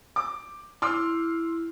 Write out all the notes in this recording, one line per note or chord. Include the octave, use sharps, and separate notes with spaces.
D6
E4 C6 D6 F6